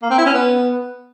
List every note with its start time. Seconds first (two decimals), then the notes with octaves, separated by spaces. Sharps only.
0.02 A#3
0.10 C4
0.18 E4
0.26 C#4
0.34 B3